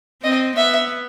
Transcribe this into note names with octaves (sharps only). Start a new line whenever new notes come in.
C4 D#5
B3 E5